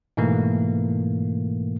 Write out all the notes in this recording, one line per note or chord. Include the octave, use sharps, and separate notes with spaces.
G#2 B2 E3 A3 A#3